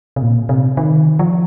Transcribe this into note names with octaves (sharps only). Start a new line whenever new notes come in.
C3
A#2
C3
D#3
F3